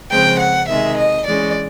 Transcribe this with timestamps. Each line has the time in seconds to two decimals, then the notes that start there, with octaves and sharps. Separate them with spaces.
0.11 C#3 F3 G#3 C4 G5
0.39 F#5
0.68 C3 D#3 G#3 E5
0.97 D#5
1.26 E3 G#3 C#4 D5